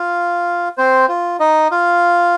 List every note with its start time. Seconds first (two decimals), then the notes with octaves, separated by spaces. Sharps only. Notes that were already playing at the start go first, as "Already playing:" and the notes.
Already playing: F4 F5
0.78 C4 C5
1.09 F4
1.40 D#4 D#5
1.71 F4 F5